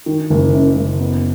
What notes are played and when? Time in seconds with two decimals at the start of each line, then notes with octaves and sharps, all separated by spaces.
0.06 D#3
0.30 F#1
0.53 F#2
0.76 F#1
1.00 B3